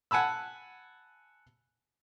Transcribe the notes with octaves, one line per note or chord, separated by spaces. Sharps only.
F#5 G#5 A5 B5 E6